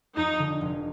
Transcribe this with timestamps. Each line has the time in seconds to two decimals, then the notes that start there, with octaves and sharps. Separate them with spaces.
0.15 F2 D#4
0.39 D3
0.61 F1